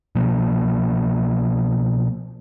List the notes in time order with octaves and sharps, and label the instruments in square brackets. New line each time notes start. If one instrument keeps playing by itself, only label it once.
[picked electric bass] B2 F3 A#3